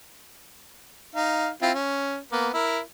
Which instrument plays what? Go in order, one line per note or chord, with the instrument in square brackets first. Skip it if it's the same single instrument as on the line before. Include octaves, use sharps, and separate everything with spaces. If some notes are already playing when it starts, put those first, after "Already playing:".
[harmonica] D#4 F5
C4 E4 F4
C#4
A#3 B3
E4 A#4